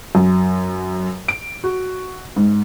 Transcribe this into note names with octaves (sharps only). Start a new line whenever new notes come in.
F#2
D7
F#4
G#2